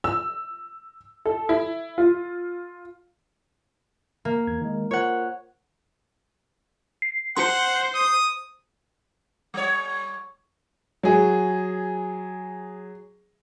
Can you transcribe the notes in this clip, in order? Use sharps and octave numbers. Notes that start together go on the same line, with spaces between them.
E6
A4
E4
F4
A#3
E2 G#6
D#3 G#3
F4 A#4 C5 C#5 F#5
C7
C5 F#5 C6 C#7
D#6
G3 C#5
F#3 G#4